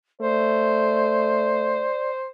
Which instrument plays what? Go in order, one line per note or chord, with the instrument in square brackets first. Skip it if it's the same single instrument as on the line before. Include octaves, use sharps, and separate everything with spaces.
[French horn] A3 [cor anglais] C5 [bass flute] D5